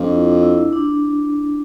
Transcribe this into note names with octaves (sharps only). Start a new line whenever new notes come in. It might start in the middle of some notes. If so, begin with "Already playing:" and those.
Already playing: F2 D4 F4
E4
D4
E4
E4
D4